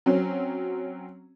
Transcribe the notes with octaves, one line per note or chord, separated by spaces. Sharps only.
F#3 C4 C#4